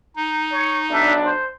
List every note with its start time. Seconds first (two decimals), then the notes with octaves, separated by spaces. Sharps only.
0.16 D#4
0.52 C#5
0.91 B1 D4 E5
1.24 C5